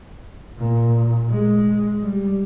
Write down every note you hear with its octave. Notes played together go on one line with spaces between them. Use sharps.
A#2
G#3
G3